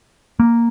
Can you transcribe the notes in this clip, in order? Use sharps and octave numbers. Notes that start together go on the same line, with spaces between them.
A#3